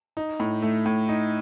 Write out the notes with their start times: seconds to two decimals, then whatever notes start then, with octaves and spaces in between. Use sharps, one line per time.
0.17 D#4
0.40 A2
0.62 A3
0.86 A2
1.09 D#4